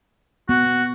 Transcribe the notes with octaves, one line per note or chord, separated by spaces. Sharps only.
B3 F#4